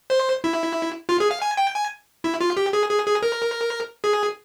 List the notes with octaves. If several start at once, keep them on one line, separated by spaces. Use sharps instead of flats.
C5
E4
F4
G#4
F5
G#5
G5
G#5
E4
F4
G4
G#4
G#4
G#4
A#4
G#4